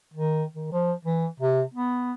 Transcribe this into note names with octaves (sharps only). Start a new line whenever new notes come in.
D#3
D#3
F3
E3
C3
B3